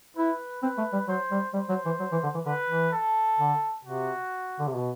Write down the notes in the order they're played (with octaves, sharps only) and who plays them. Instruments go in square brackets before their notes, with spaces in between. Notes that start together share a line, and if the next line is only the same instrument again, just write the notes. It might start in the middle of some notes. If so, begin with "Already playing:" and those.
[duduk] E4 [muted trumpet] B4
[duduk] C4 [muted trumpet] B4
[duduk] A3
G3
[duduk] F#3 [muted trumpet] C5
[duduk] G3
[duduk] G3 [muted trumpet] C5
[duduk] F#3
E3
F#3
E3
D3
E3
[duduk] D3 [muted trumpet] B4
[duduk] E3
[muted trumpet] A4
[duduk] D3
[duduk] C3 [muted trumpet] F#4
[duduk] D3
C3
B2